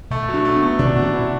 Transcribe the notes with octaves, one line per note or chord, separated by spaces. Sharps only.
B2 A3
F#3
D4
A3
B3
A3
B2 D4
F#4
B2
E4